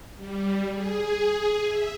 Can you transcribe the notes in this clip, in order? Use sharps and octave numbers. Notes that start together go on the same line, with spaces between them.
G3
G#4
E5